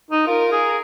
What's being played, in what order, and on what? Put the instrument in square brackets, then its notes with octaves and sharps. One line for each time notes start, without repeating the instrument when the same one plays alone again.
[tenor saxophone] D#4
[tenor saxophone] F4 [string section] A#4
[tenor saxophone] G#4